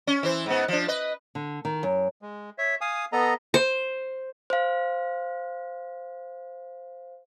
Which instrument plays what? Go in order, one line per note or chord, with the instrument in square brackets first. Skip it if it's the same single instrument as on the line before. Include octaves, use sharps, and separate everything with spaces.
[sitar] C#4
E3 E4 C5
G#2 B3
F3 D4
B4 D#5
[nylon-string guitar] D3
D#3
F#2
[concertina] G#3
C#5 E5
F5 G#5 D#6
B3 A4 D#5 A#5
[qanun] C5
[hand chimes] C5 F5